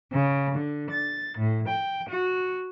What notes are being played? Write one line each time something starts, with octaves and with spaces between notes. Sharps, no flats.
C#3
D3
A6
A2
G5
F#4